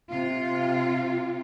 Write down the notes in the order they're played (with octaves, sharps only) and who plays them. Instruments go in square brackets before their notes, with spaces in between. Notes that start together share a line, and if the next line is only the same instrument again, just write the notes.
[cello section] C3 F4